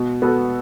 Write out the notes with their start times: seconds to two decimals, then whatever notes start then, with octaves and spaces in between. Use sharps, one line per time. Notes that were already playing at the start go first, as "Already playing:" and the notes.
Already playing: B2
0.22 B3 F#4 A4